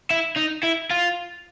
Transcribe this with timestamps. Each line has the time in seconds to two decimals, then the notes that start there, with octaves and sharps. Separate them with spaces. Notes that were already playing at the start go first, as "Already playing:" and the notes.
0.11 E4
0.37 D#4
0.63 E4
0.90 F4